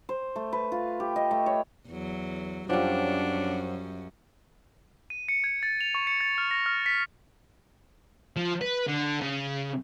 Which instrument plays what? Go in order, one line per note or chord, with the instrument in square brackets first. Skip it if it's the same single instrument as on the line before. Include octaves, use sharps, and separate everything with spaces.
[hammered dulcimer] C5
A3
B4
F4
G4
D#5
A3
C#5
[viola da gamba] E2 F#3
[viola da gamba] F#2 C#4 [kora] F3 G3 [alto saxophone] D4 [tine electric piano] C5 C#5 F#5
[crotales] D#7
C#7
G#6
A6
F7
C#6
C#7
A6
F6
A#6
F6
B6
[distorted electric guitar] F3
B4
D3
C#3